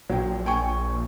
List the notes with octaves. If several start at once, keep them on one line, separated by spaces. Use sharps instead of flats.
A#1 F#3 G5
G5 G#5 C#6